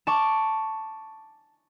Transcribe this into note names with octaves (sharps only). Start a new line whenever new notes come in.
A5 C#6 D6